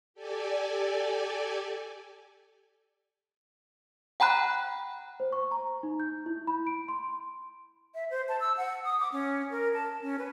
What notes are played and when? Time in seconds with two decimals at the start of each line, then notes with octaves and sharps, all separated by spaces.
0.14 G4 A4 D5 G#5
4.20 F#5 G5 A#5 B5 F#6
5.20 C5
5.32 C#6
5.51 A#5
5.83 D#4
6.00 G6
6.26 E4
6.47 B5
6.67 D7
6.88 C6
7.95 E5
8.10 C5
8.29 A5
8.40 E6
8.57 F#5
8.84 D#6
8.99 D6
9.12 C#4
9.51 A#4
9.74 A5
10.02 C#4
10.19 B4